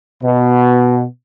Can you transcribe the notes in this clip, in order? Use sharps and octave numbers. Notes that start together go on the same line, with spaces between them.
B2